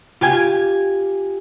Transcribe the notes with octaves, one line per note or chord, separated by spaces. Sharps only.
F4 G4 G#5 G#6